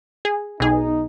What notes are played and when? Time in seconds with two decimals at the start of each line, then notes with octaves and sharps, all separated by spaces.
0.25 G#4
0.60 B1 D#4 G#4